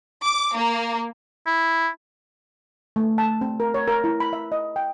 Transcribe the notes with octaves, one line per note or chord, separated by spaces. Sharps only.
D6
A#3
E4
A3
A5
C4
A#4
C#5
A#4
E4
B5
E5
D#5
G5